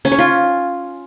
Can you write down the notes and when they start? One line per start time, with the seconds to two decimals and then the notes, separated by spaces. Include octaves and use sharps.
0.05 C#4
0.12 C#5
0.18 F4